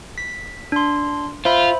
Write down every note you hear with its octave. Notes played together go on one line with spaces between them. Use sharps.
B6
D4 C6
F4 C5 E5 B5